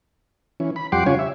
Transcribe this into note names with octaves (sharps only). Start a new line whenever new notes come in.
E3 C#4
B5
F2 G3 F#5 G5 C6 D6
C#3 C#4 F4 C#5 G#5
E5